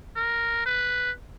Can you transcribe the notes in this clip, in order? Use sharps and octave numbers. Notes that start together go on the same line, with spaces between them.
A#4
B4